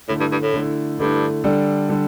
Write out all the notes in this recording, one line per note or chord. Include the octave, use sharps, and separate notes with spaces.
A2 D3 A3 E4
G2
G2
A2
D3 A3 E4
G2 D3 A3 E4
D3 G3 D4 A4
D3 G3 D4 A4